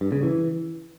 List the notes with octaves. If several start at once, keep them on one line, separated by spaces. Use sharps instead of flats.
G2
C#3
E3